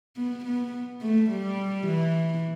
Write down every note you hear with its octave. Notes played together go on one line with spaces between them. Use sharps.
B3
B3
A3
G3
E3